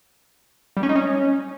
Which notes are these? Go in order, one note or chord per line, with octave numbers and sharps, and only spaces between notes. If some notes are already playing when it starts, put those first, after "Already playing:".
G3
C#4
D#4
C#4